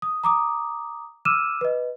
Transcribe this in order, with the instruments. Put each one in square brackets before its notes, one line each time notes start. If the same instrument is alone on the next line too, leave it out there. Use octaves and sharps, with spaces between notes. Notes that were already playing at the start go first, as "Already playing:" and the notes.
[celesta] D#6
A#5 D6 D#6
D6 E6 F6 D#7 E7
B4 D#5